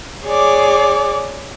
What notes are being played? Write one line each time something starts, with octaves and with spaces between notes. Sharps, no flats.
G#4 C#5 D5 D6